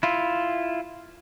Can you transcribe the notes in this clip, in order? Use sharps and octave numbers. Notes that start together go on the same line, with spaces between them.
E4 F4